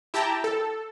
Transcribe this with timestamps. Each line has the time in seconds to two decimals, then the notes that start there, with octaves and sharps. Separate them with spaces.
0.14 E4 G4 G5 A5 A#5
0.44 A4